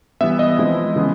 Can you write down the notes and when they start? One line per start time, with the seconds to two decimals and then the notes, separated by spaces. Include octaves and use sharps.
0.21 E3 G3 B3 E5
0.39 D#5
0.59 F3 G#3 C4 E4
0.96 C#3 E3 G#3 B3